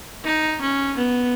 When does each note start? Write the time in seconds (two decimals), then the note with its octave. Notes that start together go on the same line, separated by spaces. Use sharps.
0.24 D#4
0.62 C#4
0.97 B3